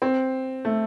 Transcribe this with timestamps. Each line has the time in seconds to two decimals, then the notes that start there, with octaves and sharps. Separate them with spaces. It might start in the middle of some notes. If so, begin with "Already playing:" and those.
0.02 C4
0.65 A3